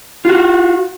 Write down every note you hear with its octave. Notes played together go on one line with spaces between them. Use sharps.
F4 F#4